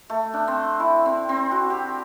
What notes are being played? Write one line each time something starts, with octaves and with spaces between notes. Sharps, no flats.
A3
D4
C4
E4
C4
C4
F#4
G4